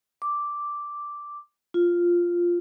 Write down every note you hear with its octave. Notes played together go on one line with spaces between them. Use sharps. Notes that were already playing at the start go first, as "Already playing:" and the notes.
D6
F4